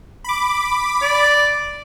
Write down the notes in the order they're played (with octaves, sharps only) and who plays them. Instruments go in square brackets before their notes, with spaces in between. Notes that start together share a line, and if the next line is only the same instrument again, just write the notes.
[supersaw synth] B5 D6
[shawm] D5